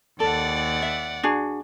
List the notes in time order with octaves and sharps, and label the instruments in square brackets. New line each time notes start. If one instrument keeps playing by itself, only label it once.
[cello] D#2 [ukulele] A4 [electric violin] D5 F#5
[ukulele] E5
D4 F#4 G#4